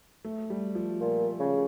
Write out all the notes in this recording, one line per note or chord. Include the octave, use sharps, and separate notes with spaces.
A3
G3
F3
A#2
C#3